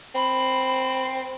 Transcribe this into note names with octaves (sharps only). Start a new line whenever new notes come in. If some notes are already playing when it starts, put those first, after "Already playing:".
C4 B5